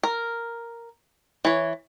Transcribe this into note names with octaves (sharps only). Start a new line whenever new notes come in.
A#4
E3 C#5